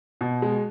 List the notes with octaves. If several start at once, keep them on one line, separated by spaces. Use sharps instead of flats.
B2
G#3